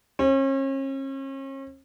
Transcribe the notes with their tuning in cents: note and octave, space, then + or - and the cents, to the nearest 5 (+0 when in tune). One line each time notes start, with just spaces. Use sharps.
C#4 -40